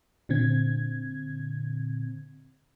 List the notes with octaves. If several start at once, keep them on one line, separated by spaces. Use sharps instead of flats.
A#2 D3 C4 G#6